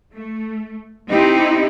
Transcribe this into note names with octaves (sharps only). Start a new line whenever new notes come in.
A3
C4 D#4 E4 G4